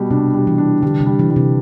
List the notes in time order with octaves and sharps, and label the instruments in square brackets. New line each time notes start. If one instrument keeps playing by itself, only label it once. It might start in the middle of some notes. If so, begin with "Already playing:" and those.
Already playing: [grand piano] B2 G3 F#4
[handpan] C3 [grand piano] D4
[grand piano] G3
[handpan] E3
[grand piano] D4
[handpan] D3 [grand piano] G3
[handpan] C3
[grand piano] G3
[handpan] E3
[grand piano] G3
[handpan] C3